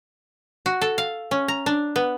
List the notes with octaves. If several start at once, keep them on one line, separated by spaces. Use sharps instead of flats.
F#4
A4
F5
C#4
A#5
D4
B3